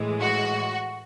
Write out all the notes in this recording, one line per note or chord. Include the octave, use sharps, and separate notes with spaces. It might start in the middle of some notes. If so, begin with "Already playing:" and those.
Already playing: A2 E3 G#3
F#4